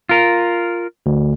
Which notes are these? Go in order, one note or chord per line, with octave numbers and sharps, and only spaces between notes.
F4 A#4
D2